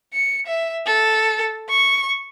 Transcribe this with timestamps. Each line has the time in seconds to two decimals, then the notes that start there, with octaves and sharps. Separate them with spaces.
0.14 C#7
0.47 E5
0.86 A4
1.69 C#6